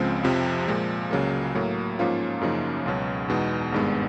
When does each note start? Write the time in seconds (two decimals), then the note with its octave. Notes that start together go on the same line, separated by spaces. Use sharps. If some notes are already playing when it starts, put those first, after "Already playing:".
Already playing: C#2 C#3 F3 G#3 C4
0.23 F2 C3 F3
0.68 A#2 F3 G#3
1.11 C#2 C#3 F#3 A#3
1.55 A2 F#3 A#3
1.99 G#2 F3 A#3 C#4 F4
2.41 F#2 C#3 F3 A#3 D#4
2.86 C#2 B2 F#3
3.28 E2 B2 G#3 B3 D#4
3.72 G#1 G2 D#3 G#3 B3